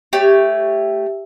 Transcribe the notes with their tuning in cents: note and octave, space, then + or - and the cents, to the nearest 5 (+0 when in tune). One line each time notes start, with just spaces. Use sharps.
A3 +0 G4 +5 C#5 +0